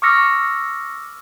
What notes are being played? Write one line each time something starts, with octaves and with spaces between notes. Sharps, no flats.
C#6 D6 E6 F6 A#6 C#7